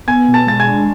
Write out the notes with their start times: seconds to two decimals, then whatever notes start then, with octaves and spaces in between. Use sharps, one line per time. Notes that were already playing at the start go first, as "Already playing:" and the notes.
0.07 B3 G#5 G#6
0.28 B2
0.34 A5 A6
0.47 G#3 A6
0.60 G#5 G#6
0.67 D4